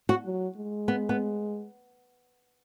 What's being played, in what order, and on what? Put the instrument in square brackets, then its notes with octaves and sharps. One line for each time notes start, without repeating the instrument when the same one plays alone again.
[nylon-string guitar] F#4
[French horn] F#3
G#3
[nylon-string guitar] B3
B3